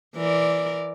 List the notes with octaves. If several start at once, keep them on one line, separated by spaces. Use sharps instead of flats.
E3 A#4 D5